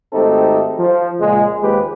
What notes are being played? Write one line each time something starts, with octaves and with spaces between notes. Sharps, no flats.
G#1 A3 C4 D#4 G4 A4
F3
C#2 A#2 G#3
D#2 F3 G#3 G4 B4